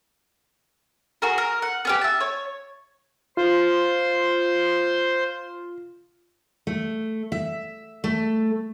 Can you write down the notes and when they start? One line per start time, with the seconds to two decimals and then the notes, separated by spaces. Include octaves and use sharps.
1.22 F#4 G#4 A#4
1.38 A#4
1.62 F#5
1.85 B3 C#4 G4
2.01 E5 A5
2.20 C#5
3.37 F4 C5 C6
6.67 A3
7.32 E5
8.04 A3